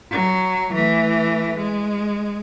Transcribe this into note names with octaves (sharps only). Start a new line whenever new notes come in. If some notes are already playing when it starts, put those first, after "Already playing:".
F#3
E3 A3
G#3